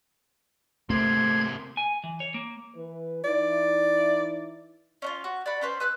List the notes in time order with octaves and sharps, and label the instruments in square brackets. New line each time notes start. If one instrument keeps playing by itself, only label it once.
[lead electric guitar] C3 A#3 [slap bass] A3 [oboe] C5 [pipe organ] G#6
[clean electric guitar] G#5
E3
C#5
A#3
[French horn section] E3 B4
[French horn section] E3 D#4 E4 [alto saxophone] D5
[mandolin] C#4 D4 F4
F#4
D5 F#5 B5
C#4 B4 C5
B4 E6 F#6